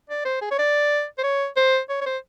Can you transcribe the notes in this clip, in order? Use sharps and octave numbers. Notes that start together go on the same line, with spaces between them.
D5
C5
G#4
C#5
D5
C5
C#5
C5
C#5
C#5
C5